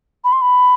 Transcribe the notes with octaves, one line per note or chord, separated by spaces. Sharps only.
B5
C6
B5